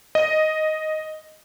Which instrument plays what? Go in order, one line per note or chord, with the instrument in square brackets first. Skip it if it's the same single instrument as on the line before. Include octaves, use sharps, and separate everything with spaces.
[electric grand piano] D#5